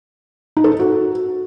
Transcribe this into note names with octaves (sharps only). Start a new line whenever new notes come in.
D#4
A4
D#4
F#4